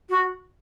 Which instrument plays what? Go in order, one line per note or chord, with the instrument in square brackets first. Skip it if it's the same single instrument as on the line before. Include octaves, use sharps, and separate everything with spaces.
[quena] F#4